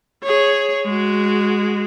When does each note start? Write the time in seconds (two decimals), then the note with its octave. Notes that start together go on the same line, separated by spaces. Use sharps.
0.23 G#4 C#5
0.86 G#3 F#4